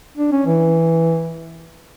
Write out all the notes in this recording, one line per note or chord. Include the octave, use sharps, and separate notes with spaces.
D4
C#4
E3